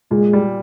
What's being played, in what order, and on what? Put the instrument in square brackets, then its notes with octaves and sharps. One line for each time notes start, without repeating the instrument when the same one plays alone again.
[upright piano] A#2 [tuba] G#3
[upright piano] G3